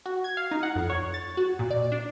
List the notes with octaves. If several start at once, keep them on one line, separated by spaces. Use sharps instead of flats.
F#4
G#6
F5
D#4
F#5
F2
C#5
A6
F#4
A#2
D5
D4